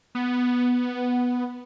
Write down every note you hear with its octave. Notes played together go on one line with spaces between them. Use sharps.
B3